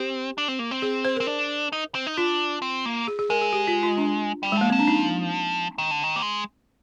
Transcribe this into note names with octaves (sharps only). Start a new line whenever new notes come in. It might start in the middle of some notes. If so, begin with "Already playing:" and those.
Already playing: C4 G4
D4
C4
A#3
C4
G#4
C5
C4 A#4
D4
D#4
C4
D#4
D4 F4
C4
A#3
G#4
G#4
G#3 A#4
G#4
G4
F4
F4
D4
G3
G#3
F3 A#3
F3 C4
D4
D#4
D#3
D3
D#3
A#3
G#3